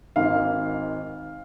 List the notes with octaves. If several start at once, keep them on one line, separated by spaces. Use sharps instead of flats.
G#1 G#2 D#3 F5